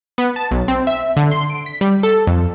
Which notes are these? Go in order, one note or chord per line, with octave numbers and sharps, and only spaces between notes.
B3
A5
B1
C4
E5
D3
C6
D7
B6
G3
A4
F2